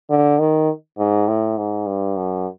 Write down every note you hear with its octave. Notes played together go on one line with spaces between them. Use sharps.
D3
D#3
G#2
A2
G#2
G2
F#2